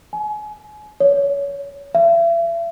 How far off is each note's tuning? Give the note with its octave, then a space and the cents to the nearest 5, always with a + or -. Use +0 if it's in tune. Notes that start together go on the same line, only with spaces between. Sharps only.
G#5 +35
C#5 +25
E5 +40